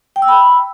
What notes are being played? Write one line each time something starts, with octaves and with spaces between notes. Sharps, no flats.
G5
E6
B5